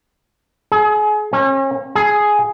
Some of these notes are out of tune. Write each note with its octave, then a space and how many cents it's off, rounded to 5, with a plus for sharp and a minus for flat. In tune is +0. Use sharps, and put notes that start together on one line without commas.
G#4 +30
C#4 -40
G#4 +5